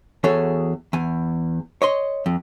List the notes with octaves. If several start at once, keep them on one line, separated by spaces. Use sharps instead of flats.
E2 F#4 G#4 A4 C#5
E2 G#5
C#5 D#5 C6
F2